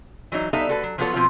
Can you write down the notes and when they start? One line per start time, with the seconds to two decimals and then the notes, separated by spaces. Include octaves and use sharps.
0.32 E3 F#3 D#4
0.53 G3 B3 D#4 A4 E5 F5
0.69 A3 F#4 A4 B4
0.83 F#3
0.98 F3 F#3 B3 F4 A4 C#5
1.13 B2 F3 C4 F4